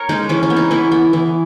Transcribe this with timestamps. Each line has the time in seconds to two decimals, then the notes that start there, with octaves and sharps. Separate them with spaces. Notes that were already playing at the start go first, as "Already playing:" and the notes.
Already playing: A#4 C#5
0.09 G#3 C#4 D#4
0.29 E3 C#4
0.43 C#4
0.50 B3
0.57 D#4
0.71 E3 C#4 E4
0.92 B3
1.13 E3